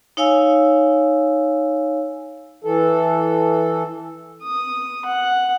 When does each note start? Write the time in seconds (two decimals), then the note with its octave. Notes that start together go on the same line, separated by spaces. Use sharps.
0.17 D#4 C#5 F5 G#5 E6
2.64 E3 A4
4.43 D#6
5.05 F#5